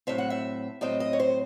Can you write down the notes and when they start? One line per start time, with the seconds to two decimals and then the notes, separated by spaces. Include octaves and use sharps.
0.07 A2 F#3 C4 E5
0.18 F#5
0.30 E5
0.81 A2 F#3 C4 D#5
1.00 D#5
1.13 C#5
1.20 C5